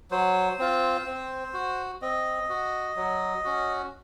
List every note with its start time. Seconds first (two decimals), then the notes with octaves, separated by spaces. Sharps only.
0.11 F#3 C5
0.59 C4 F4
1.06 C4
1.54 F#4
2.02 C4 D#5
2.49 F#4
2.96 F#3
3.44 C#4 F#4